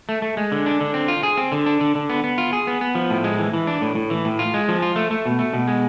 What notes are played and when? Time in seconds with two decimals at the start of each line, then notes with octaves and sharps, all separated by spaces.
0.09 A3
0.22 A3
0.37 G#3
0.52 D3
0.66 D4
0.81 D3
0.94 C4
1.08 F4
1.23 G#4
1.37 C4
1.52 D3
1.66 D4
1.81 D3
1.95 D3
2.10 B3
2.24 B3
2.38 F4
2.53 G#4
2.67 B3
2.81 B3
2.95 F3
3.10 A2
3.24 G#3
3.39 E3
3.53 E3
3.67 D4
3.81 A2
3.95 A2
4.10 E3
4.25 A2
4.39 F4
4.54 G#3
4.68 F3
4.82 F4
4.96 A3
5.11 A3
5.26 B2
5.39 A3
5.53 B2
5.68 G#3